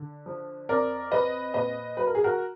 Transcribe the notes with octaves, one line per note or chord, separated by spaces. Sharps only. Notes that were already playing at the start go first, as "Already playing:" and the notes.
Already playing: D3
F3
F2 A#4 D5
F3 B4 D#5
A#2 B4 D#5
F#3 B4
A#4
G#4
F#4 A#4